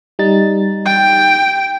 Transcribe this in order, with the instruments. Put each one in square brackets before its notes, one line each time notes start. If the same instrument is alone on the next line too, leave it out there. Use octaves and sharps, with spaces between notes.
[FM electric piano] G3 D#4 A6
[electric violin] G5